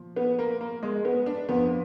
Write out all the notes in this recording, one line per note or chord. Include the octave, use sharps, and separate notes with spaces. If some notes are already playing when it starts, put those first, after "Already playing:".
Already playing: A#2 F3
B3
A#3
A#3
G#3
B3
D4
F2 F3 B3